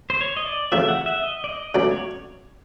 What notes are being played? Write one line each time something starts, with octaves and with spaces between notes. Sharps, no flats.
C5
C#5
D#5
D5
D2 C#3 F3 A3 C4 E5
F#5
E5
D#5
D5
D#5
C#2 B2 F#3 A3 C#4 D5
C#5